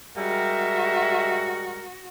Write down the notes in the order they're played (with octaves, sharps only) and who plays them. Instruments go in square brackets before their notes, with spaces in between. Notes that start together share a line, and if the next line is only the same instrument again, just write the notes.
[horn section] G3 G#3 A#4 [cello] F#4 [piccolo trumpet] E5